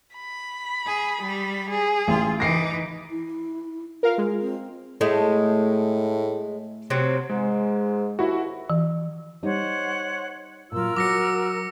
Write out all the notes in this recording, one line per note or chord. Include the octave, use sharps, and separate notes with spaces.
B5
G#4
G3
G#4
A1 F4
E3 D#4 D6 A#6 C7
E4
F4 A#4 F5
G#3
C4
A2 G#3 A3
C3 F#3 C4
G#2 G#3
D#2 E4 F#4
E3
G3 D#4 C5 C#5 F#5
A#2 F#3 F4 A#4 E6
F#3 F#4 C#5 D6 A#6 C#7